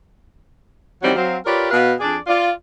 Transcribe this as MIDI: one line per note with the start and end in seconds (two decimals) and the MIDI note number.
1.02 1.14 51
1.02 1.14 52
1.02 1.14 54
1.02 1.14 55
1.02 1.14 60
1.15 1.36 54
1.15 1.36 60
1.15 1.36 77
1.45 1.68 65
1.45 1.68 67
1.45 1.68 70
1.45 1.68 71
1.45 1.68 73
1.45 1.68 74
1.70 1.92 47
1.70 1.92 71
1.70 1.92 77
2.00 2.17 41
2.00 2.17 62
2.00 2.17 68
2.00 2.17 74
2.27 2.49 65
2.27 2.49 74